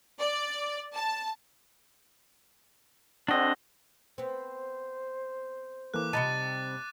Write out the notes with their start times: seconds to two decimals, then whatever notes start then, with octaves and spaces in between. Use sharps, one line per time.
0.21 D5
0.93 A5
3.28 D3 C4 D4 F#4 D#5
4.18 B3 C4 C5
5.94 E3 A#3 A4 D6 F#6
6.13 C3 G3 D#4 A5 B5 A6 C#7 D#7